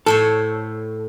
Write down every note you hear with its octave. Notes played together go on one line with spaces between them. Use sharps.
A2 A4 C5 C#5